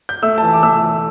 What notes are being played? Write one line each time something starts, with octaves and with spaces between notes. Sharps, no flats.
G6
A3 E6
E3 A5
D6
A3 E6